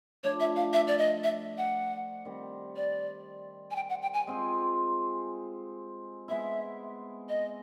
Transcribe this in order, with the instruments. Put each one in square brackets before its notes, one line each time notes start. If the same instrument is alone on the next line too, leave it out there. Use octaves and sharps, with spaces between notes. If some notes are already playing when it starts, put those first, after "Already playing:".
[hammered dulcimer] F3 A3 D4 [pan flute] C#5
[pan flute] E5
F5
E5
D5
D#5
E5
F#5
[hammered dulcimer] D#3 G3 C4
[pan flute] D5
G#5
G5
F#5
G5
G#5
[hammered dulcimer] G#3 C4 F4 G#4
[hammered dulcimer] G#3 B3 E4 [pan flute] E5
[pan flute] D#5